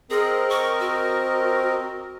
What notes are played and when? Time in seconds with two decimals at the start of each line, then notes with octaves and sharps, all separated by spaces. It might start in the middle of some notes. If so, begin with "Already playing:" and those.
0.10 C4 G#4 A#4 D#5
0.50 C#6
0.80 F#4